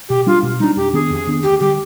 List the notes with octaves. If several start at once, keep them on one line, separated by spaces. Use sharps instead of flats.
B2 G4
G3 D4 F4
B2
G3 D4 D#4
F2 G4
D#3 B3 D4 G#4
F2
D#3 B3 D4
D2 G4
D3 G3 G4